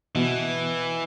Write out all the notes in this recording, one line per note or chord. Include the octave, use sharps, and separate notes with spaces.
B2 E3